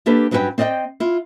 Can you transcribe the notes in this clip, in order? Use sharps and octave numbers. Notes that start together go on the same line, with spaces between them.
A#3 D4 G4 A4 B4
G2 F#3 C#4 A4 B4 G5
C4 D5 D#5 F5 G5
E4 F4